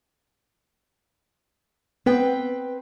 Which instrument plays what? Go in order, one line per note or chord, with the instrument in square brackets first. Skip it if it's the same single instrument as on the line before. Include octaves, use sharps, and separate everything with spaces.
[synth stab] B3 [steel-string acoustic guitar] C4 B4 G5